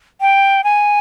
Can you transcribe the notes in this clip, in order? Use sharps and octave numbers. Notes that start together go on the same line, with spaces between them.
G5
G#5